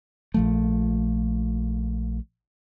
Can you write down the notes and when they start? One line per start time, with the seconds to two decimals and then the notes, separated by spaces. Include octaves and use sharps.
0.34 A#1 F3 A3